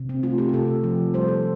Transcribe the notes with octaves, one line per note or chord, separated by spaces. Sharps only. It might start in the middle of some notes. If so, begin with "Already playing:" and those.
Already playing: C3
C4
A3 F4
G4
G4
C3 A4
F3
G3 C5
A4